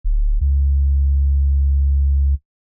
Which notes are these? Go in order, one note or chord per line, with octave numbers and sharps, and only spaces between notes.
D1
C#2